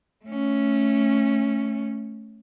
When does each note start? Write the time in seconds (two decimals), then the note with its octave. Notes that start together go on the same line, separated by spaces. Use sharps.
0.24 A3 C#4